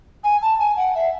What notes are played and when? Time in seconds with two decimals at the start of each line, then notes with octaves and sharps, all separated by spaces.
0.24 G#5
0.42 A5
0.59 G#5
0.77 F#5
0.95 E5